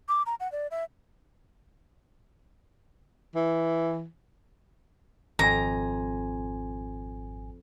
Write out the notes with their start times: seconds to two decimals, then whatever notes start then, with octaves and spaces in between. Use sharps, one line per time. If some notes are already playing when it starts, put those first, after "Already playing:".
0.09 D6
0.26 A#5
0.40 F#5
0.52 D5
0.71 E5
3.35 E3
5.39 G#1 F2 G#5 A#5